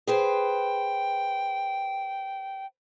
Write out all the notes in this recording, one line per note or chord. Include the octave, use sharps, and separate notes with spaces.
G#4 B4 C5 G5